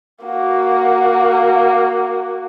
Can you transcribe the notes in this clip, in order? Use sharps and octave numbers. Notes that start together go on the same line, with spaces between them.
A#3 F#4